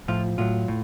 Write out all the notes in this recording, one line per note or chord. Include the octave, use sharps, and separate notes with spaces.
A2 F3 F4
A2 F#3 F4
A2